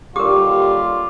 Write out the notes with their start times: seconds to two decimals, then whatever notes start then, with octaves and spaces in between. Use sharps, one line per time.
0.16 D#2 D3 G3 F4 G4 A#4 D6